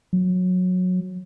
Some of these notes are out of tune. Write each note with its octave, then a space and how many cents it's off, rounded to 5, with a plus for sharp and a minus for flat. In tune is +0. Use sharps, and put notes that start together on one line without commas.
F#3 -20